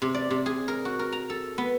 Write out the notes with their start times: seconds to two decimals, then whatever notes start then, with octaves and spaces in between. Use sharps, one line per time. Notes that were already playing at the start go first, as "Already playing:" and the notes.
0.02 C3
0.14 D5
0.30 C3
0.46 G#4
0.68 A#4
0.85 F#4
0.99 A#4
1.12 A#5
1.30 A4
1.58 B3